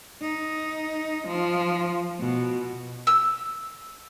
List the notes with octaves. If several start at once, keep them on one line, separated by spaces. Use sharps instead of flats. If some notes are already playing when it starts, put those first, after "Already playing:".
D#4
F3
B2
E6